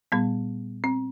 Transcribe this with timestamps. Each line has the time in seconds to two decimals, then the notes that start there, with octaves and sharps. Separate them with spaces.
0.12 A#2 G3 B3
0.84 C4